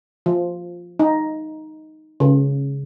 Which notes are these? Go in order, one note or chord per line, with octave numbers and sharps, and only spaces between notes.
F3
D#4
C#3